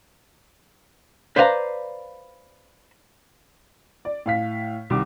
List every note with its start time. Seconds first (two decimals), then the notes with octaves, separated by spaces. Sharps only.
1.36 B4 C5 D5 F5 G#5 A#5
4.05 D5
4.26 A2 F5 B6
4.90 C2 D#3 G3 D6